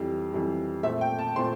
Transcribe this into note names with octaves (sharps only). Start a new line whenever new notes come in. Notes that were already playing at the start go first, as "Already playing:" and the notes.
Already playing: F2 E3 G3
F2 E3 G3
A#2 A3 C4 E5
G5
A5
A#2 A3 C4 C6